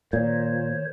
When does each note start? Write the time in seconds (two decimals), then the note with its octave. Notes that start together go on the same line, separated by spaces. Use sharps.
0.13 A#2 D#3 C5 C#5